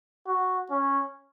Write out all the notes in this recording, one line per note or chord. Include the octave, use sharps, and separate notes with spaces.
F#4
C#4